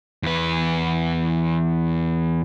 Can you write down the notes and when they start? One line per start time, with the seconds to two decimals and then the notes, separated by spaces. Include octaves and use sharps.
0.23 E2 B4